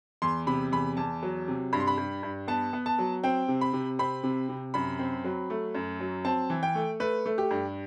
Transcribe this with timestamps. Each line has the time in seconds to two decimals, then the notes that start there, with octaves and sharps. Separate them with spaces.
0.22 E2 C6
0.47 C3 B5
0.72 E2 B5
0.97 E2 A5
1.23 F#3
1.48 C3
1.73 G2 B5
1.80 C6
1.87 B5
1.98 G2
2.23 G2
2.48 B3 A5
2.73 B3
2.86 A5
2.98 F#3
3.24 C4 G5
3.48 C3
3.61 B5
3.73 C3
3.99 C4 B5
4.24 C3
4.49 C3
4.74 F#2 B5
4.99 C4
5.24 F#3
5.50 A3
5.75 F#2
6.00 F#3
6.25 C4 A5
6.50 E3
6.63 G5
6.75 A3
7.00 A3 B4
7.26 A3
7.38 G4
7.51 G2